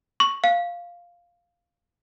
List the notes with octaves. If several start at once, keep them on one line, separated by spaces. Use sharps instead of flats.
C#6
F5